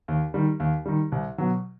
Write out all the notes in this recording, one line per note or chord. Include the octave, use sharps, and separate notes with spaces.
D#2
D#3 G3
D#2
D#3 G3
C2
B2 F#3